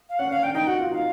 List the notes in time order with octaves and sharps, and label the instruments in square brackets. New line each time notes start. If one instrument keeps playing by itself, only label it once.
[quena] F5
[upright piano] C#4 [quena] F#5
[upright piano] C#4 [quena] F5
[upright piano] D4 [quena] G5
[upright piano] D#4 [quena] G5
[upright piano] F#4 [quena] F#5
[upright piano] F4
[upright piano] D#4 [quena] F5